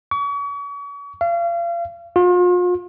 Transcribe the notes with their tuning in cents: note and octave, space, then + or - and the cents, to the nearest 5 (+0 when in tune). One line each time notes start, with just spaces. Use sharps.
C#6 +40
F5 -35
F4 +40